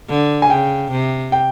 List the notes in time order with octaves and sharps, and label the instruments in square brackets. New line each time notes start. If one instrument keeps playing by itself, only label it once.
[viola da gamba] D3
[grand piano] G#5
[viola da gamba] C#3 [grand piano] G5
[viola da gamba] C3
[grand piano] G5